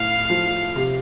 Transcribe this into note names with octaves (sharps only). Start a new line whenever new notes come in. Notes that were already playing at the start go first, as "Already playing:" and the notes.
Already playing: A2 F5
F3
C3